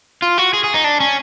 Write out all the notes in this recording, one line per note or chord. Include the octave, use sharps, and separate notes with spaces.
F4
F#4
G#4
G#4
D#4
D4
C#4